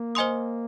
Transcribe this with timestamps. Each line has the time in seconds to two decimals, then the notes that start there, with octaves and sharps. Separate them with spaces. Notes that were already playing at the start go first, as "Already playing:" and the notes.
Already playing: A#3
0.15 C5 D#5 G#5 C6 D#6